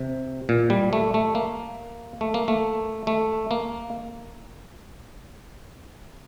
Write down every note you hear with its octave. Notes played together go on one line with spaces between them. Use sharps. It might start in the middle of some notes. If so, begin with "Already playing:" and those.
Already playing: C3
A#2
G3
A3
A3
A#3
A3
A#3
A3
A3
A#3